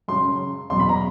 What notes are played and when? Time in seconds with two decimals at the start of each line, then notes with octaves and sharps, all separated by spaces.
0.08 F#2 C#3 F#3 C6
0.70 E2 B2 F#3 C6
0.79 B5
0.89 A#5